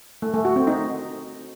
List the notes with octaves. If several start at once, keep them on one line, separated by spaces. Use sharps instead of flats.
A3
A3
F#4
C4
D#4